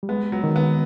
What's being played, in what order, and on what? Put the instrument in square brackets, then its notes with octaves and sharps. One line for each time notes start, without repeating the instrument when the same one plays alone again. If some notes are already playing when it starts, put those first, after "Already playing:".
[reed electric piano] G3
[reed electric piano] G#3 [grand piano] B3
[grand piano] F#3
[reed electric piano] D#3
[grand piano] B3